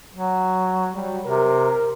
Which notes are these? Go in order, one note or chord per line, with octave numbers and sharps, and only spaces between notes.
F#3
F#3 G3
C3 A#4